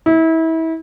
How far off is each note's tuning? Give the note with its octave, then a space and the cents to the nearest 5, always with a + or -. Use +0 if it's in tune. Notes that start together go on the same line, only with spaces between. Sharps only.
E4 -30